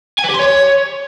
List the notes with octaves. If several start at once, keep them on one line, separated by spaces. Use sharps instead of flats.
G#5
B4
G4
C6
C#5